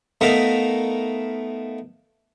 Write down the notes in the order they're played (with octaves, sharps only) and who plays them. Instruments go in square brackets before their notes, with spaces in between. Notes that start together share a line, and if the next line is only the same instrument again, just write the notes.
[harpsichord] A3 B3 D#4 A#4 E5 F5